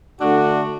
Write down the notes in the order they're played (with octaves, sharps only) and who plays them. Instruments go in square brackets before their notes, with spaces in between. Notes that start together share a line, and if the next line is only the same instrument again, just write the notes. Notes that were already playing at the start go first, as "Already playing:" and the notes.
[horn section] D3 A3 D4 F#4